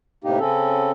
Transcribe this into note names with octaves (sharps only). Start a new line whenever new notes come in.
A2 C3 A#3 D#4 G4
C#3 C4 C#4 A4